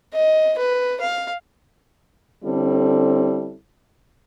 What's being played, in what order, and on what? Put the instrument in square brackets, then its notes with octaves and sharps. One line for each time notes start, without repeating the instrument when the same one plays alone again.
[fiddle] D#5
B4
F5
[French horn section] D3 G3 C4 C#4 E4 A4